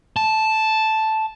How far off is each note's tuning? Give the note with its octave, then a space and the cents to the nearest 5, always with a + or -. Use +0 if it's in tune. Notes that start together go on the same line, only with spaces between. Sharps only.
A5 -5